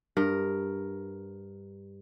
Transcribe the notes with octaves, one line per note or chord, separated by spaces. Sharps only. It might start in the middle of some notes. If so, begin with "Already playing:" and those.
G2 A#4